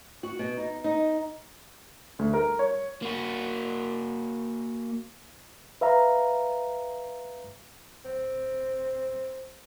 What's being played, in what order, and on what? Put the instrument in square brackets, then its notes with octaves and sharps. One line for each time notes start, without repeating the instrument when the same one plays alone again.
[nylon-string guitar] F#4
B2
D#4
D#4
[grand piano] D2
A#4
C#5
[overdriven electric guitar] A#3 F#4
[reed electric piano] B4 E5 F5 A#5
[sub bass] D1 [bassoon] C4